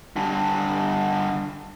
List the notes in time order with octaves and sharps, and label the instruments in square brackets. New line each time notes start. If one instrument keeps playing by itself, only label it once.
[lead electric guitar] G2 D3